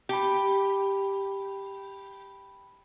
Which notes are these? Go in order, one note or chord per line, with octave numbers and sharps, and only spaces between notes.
G4 G5 A5 B5